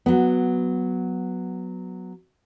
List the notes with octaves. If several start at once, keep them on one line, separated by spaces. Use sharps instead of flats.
F#3 B3